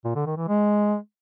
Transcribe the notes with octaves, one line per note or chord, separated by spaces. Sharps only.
A#2
D3
D#3
E3
G#3